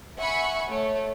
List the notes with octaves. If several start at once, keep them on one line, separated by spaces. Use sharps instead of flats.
E5 F#5 G#5 B5 C#6
A3 C#5